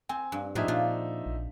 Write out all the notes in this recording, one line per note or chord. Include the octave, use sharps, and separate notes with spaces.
C4 G#5
G2
A2 F3 D4 D#4 G4 G#4 E5
A#2 D4 F4
A#1